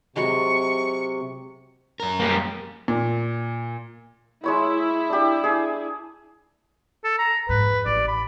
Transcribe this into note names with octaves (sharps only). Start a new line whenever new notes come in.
C3 F#3 G#3 A5 C#6
F#2 A#4
G3 A#3
A#2
G#3 E4 C#5 B5
D4 G4
G#4 G#5
A4
A#5
F2 G#2 B4
A1 D5
B5